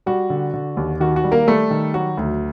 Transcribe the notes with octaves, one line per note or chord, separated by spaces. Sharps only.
G3 F#4
D3
D3
D#2
D#3 F#4
F#4
G3
A#3 A#4
G3 A3 A4
D#3
F#3 F#4
D2